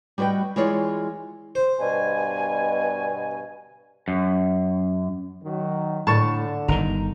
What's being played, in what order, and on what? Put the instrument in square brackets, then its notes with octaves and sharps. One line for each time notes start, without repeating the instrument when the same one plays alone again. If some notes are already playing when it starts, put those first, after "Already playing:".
[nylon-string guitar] G3 F#4 B4 D#5 G5
E3 G#3 F4 C#5 D5
[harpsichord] C5
[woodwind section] G2 B2 G#5
[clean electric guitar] F#2
[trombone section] D#3 F#3
[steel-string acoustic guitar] A2 [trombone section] D3 [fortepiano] A5 C#6
[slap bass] G1 B2 D#3 [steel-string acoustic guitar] A#5